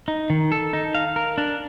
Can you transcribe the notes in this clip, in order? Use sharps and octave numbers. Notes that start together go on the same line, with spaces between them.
D#4
D#3
A4
D#4
F5
A#4
D4